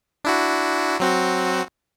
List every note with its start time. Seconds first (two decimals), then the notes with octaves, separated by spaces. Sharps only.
0.25 D4 E4 F#4
1.00 F#3 C4 F#4